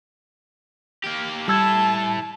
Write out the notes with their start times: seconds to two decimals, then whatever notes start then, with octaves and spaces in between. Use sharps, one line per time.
1.04 A#3 G4
1.48 G3 E4 A4 A5 E6 G#6